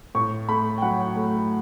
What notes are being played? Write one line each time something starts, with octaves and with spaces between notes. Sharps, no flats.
A2 C#6
A3 B5
G5
F#3 F#5
A3